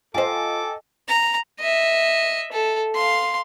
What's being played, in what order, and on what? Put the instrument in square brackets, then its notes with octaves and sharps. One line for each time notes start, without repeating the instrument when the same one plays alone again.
[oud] F4 C5 [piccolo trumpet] A4 [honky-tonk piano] D#5 G5 G#5 [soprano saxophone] D6
[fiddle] A#5
[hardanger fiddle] D#5 E5
A4
F5 C6